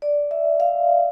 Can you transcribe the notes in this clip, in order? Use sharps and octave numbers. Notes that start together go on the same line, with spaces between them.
D5
E5
F5